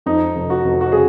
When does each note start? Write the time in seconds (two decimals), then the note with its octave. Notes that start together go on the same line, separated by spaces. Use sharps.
0.06 F2 D#4
0.36 F1
0.50 F#4
0.64 F1
0.81 F#4
0.92 C#3 G#4